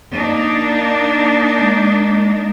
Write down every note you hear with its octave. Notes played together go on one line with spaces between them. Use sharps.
A#3 D4 D#4
G#3